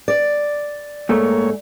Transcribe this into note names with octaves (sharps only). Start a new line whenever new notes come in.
D5
G#2 A3 A#3 C#5